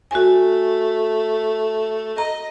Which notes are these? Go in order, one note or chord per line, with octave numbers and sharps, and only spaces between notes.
A3 F#4 G#5
D#5 A#5